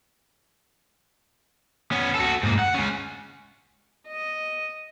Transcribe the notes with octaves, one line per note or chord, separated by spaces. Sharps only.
B3 C#4
F#4 A4
G#2 A#3
F#5
G#3 C#4
D#5